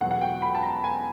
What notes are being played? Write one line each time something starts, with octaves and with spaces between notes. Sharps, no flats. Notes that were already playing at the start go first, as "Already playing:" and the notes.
E2 B2 F#3 F#5
F#5
G5
B5
A5
A#5
G#5